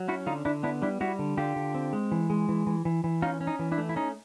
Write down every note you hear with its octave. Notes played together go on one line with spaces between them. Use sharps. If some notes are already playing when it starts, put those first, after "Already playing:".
Already playing: F#3
C#4 E4 F#4
D3 D#4 F4
D3 D4 E4
B3 D4 E4
G3 D4 E4
G3 E4 F#4
D3
D3 F4 G4
D3
C4
G#3
E3
G#3
E3
E3
E3
E3
C#4 D#4 F4
C#4
D#4
E3
D4 E4
A3
E4
C#4 D#4